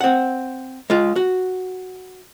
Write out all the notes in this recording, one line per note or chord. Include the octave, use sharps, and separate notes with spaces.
C4 F#5
G#3 F4
F#4